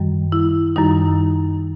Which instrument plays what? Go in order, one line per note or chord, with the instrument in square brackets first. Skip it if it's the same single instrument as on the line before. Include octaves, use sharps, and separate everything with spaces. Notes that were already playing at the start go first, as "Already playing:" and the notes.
Already playing: [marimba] F#2 D#3 G3
E4
F#2 D#3 G3 D#4